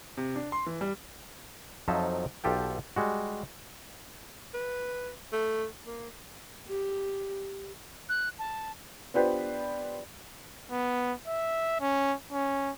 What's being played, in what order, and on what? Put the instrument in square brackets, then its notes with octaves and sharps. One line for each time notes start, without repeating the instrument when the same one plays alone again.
[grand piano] C3
D4
C6
E3
G3
[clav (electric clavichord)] F2 F3 F#3 D#4 E5 A5
B1 F4 G4 A4 G5
G3 G#3 F#4
[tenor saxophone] B4
A3
A#3
[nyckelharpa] G4
[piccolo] F#6
A5
[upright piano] B3 D4 F4 G4 B4 C5
[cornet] B3
E5
C#4
C#4